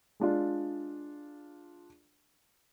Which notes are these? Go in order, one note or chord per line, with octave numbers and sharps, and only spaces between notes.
G#3 D4 F4